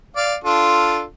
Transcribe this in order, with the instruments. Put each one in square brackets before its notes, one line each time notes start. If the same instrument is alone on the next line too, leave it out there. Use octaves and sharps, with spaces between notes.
[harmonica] D5 F5
D4 F4 A4